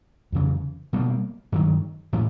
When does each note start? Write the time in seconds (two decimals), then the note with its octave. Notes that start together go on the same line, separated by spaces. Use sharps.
0.32 F2 C#3 E3
0.93 B2 G3 A#3
1.52 G2 D#3 F#3
2.13 A2 E3